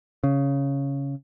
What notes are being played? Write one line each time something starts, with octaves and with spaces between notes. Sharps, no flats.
C#3